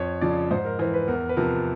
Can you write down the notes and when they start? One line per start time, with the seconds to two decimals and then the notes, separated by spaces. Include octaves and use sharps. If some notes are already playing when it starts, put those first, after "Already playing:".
Already playing: F2 C#5
0.21 C#3 F3 D5
0.51 G#2 C5
0.65 A#4
0.79 E3 C5
0.94 B4
1.08 E2 A#4
1.29 B4
1.37 C3 F3 A#4